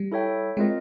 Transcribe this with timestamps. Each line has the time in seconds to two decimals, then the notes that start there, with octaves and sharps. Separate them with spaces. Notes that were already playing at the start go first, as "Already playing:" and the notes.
Already playing: G3
0.12 E4 A4 C#5 E5 G5
0.57 G#3 C4 F4 A#4 D#5